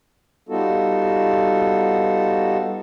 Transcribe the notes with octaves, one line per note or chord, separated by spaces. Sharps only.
G3 B3 D#4 F4 F#4 A4